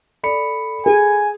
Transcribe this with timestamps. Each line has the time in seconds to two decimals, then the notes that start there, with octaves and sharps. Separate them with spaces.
0.23 A4 D5 B5 C#7
0.86 G#4 G#5